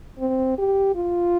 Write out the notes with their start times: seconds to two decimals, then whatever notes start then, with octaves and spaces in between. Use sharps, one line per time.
0.19 C4
0.58 G4
0.95 F4